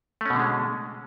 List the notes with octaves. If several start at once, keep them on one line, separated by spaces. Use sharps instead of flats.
B2 D3 G#3 A3 C#4